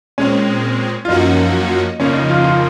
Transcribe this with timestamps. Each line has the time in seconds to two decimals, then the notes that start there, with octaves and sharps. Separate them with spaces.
0.18 A#2 G#3 C4 C#4
1.05 F4
1.08 F#2 F3 A#3 C#4 D#4 F#4
1.99 F2 C#3 F3 A#3 C#4
2.14 D#4
2.29 F4
2.44 F4